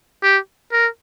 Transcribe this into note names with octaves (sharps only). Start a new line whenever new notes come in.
G4
A#4